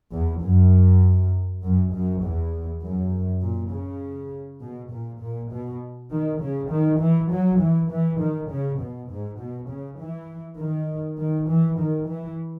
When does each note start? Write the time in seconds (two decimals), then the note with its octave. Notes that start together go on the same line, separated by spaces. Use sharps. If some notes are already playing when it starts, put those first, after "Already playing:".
0.13 E2
0.43 F#2
1.64 F#2
1.93 F#2
2.23 E2
2.83 F#2
3.42 A#2
3.73 C#3
4.62 B2
4.92 A#2
5.21 A#2
5.52 B2
6.12 D#3
6.41 C#3
6.71 D#3
7.00 E3
7.31 F#3
7.60 E3
7.91 E3
8.20 D#3
8.51 C#3
8.81 B2
9.11 G#2
9.40 B2
9.69 C#3
10.00 E3
10.60 D#3
11.19 D#3
11.49 E3
11.79 D#3
12.09 E3